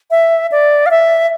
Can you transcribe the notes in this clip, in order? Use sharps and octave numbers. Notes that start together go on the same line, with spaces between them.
E5
D5
F5
E5